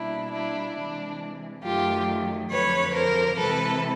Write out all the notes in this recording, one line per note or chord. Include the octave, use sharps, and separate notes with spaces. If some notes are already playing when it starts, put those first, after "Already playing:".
Already playing: B2 G3 A#3 D4 E4
D4 E4
C3 E3 G#3 D4
F#2 D#3 F#3 A3 F4 G4
F2 D3 F#3 B4 C#5
A#4 C5
C3 E3 G#3 A4 B4